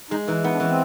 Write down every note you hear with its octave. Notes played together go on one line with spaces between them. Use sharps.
G#3 D#4
E3 D#4
B3 D#4
D4
E3 C#4
C4